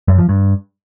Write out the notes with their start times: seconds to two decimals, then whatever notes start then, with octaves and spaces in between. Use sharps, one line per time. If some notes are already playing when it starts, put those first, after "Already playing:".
0.08 F#2
0.18 F3
0.29 G2